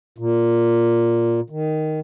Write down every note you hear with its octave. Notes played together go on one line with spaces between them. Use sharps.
A#2
D#3